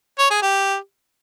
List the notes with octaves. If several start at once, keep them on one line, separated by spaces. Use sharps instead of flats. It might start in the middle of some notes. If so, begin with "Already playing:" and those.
C#5
G#4
G4